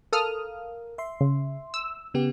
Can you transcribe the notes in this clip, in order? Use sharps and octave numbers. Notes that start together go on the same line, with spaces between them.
A4 A#4 F5 D#6 F6
E5 C6
C#3
E6
C#3 B3 G4